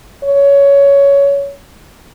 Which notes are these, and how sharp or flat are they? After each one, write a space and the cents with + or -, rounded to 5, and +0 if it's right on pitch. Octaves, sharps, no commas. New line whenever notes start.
C#5 +15